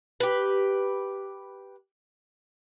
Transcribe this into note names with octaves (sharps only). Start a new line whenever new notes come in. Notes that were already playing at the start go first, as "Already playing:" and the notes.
G4 B4